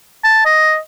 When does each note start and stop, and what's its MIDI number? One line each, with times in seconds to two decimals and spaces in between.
0.24 0.41 81
0.45 0.78 75